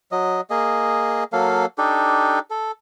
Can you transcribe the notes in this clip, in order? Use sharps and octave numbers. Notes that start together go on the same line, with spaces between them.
F#3 D#5
A#3 G#4 D#5
F#3 A#3 A4 F5
D4 D#4 G4 A4
A4